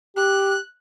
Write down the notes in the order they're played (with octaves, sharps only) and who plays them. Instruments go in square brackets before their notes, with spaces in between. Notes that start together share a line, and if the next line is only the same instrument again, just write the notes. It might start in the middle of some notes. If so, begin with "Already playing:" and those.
[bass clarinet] G4 [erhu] F#6